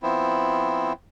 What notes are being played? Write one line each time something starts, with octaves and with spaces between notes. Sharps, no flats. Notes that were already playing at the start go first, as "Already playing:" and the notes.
F3 B3 C4 E4